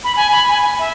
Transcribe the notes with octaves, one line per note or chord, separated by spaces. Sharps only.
B5
G#5
B5
G#5
E5